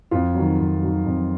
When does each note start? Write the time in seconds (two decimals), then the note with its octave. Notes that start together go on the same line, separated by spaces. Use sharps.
0.11 F2 F4
0.35 D#3 F#3
0.59 F2
0.82 D#3 F#3
1.05 F2